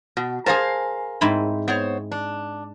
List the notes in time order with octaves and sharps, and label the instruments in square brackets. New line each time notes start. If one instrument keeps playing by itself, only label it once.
[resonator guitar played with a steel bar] B2
[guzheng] G#4 A5 [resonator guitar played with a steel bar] A#4 C5 F5
[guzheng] G#2 C4 E4
[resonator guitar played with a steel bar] B3 C5 C#5
D4